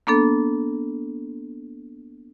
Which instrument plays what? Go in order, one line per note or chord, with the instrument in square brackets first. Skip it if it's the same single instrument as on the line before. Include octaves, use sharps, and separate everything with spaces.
[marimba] A#3 B3 D4 A4